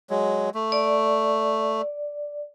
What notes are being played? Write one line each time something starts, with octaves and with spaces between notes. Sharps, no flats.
F#3 G#3
A3
D5